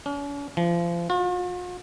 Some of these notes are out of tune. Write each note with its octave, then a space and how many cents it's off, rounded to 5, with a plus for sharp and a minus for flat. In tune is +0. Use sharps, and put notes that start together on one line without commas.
C#4 +45
F3 -30
F4 +45